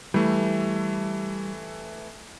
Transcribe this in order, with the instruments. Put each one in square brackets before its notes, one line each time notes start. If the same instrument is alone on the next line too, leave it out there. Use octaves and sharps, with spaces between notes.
[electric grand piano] E3 A3 [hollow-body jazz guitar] G3